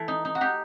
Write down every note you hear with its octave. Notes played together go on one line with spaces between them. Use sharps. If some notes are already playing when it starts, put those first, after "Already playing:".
Already playing: E3 A3 A4
D#4
D#4
F#4
D#4 G4